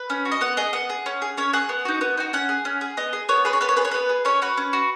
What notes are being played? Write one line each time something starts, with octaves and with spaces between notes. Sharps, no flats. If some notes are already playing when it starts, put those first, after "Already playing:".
Already playing: B4
C#4
F#4
D#5
B3 F#5
G#4 D#5
B3 F#5
G#4
C#4
G#4
C#4 C#5
G#4 F#5
B3
D#4 F#4
B3
D#4 F#4
C#4 F#5
G#4
C#4
G#4
B3 D#5
G#4
B3 C#5
G#4 B4
C#5
B3 B4
C#5
G#4 B4
C#5
B3 B4
G#4
C#4 C#5
F#4 B4
C#4
F#4